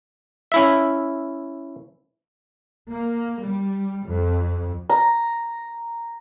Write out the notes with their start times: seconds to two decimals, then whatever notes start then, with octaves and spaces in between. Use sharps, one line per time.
0.52 C#4 E4 E5
2.92 A#3
3.42 G3
4.09 F2
4.90 A#5